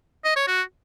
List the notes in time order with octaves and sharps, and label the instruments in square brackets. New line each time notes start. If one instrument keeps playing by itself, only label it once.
[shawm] D#5
C#5
F#4